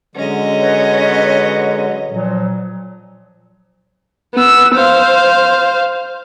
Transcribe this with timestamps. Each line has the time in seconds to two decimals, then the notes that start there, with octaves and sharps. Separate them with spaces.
0.15 D3 F#3 G#3 C#4 D#5
0.61 B4 C#5
2.09 A#2 F3 F#3
4.35 B3 E6
4.75 C5 F5